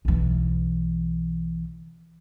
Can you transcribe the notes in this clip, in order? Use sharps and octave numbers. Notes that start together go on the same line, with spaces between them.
B1 E3